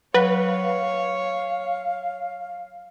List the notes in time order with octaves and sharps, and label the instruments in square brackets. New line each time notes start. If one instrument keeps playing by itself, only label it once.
[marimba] F#3 [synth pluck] B4 [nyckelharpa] C#5 [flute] F5